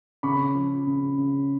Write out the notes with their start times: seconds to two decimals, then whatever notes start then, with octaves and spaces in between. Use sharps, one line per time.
0.23 C#3 B5 C#6
0.55 F3
0.87 C#3
1.18 C#3